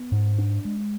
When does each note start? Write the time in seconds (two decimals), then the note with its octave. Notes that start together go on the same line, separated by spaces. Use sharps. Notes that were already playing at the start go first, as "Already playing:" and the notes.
Already playing: B3
0.12 G#2
0.39 D4
0.65 G#3